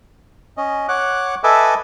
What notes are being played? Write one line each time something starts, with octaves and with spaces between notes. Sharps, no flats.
C#4 D#5
C#5 F#5 D6 F#6
A4 B4 D#5 E5 G#5 D6